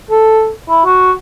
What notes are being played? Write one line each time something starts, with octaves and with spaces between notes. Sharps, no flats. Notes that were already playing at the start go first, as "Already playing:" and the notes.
A4
E4
F#4